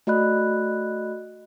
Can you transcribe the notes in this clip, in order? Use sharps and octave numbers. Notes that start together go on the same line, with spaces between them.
A3 F#4 D5 D#5 B5 F#6